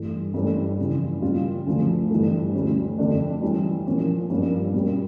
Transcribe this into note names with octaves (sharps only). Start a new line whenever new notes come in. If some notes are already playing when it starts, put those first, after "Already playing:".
Already playing: G2 E3 A3
G2 E3 A3 C#4 G4
F2 C#3 E3
A#2 G3 C#4 F4
D2 D3 F3
G2 E3 A3
D2 D3 G3 C#4
F2 D3 A3 D4
E3 G3 C#4
A#2 F3 A#3 C#4
G2 F3 A#3 C#4
A#2 G3 C#4